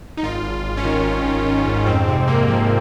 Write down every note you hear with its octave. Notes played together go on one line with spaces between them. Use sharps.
D#4
G#1 F4
G#1
G#1
C#4
D#3
G#1
D#3
D#3
G#2
F2 C4
C3 C4
C3 A#3
F3 C4